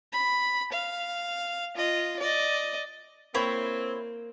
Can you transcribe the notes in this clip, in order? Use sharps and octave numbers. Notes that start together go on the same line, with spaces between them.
B5
F5
F4 D#5
D5 D#5
A#3 C4 E4 C#5